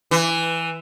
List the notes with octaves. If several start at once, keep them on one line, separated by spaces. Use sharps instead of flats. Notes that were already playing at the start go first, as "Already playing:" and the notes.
E3